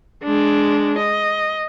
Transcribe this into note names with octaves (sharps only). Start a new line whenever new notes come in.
G#3 D4
D#5